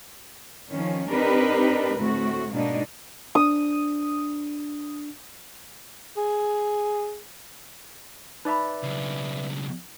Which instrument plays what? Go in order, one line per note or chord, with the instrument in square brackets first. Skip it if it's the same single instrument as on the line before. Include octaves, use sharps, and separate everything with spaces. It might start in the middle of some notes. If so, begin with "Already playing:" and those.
[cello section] D#3 F3 C#4
C4 D4 D#4 G4 A#4 B4
D2 A2 A3 C4 F#4
G#2 B2 G#3 A#3 D4 D#4
[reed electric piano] D4 [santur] D#6
[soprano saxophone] G#4
[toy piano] D#4 B5 [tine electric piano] B4 D5 E5
[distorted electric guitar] B1 C#3